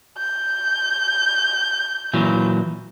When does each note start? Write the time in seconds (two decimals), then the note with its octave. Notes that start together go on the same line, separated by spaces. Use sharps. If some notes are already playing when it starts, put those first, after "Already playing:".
0.18 G6
2.13 A#2 E3 F#3